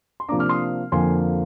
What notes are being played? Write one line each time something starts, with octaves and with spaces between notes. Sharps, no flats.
C6
C3 F3 A#3 D4 A#5 D6
D6 F6
C6 D#6
F2 D3 F3 A#3 G#5 C6